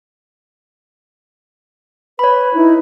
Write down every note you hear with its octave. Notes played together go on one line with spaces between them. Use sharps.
B4 C#5 B5
D#4 E4